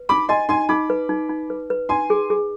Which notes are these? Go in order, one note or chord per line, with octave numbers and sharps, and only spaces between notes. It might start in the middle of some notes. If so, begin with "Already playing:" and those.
Already playing: B4
D#4 B5 D6
D#5 G#5 C6
D#4 G#5 C6
D#4 B5 D6
B4
D#4
D#4
B4
B4
D#4 G#5 C6
G#4
G#4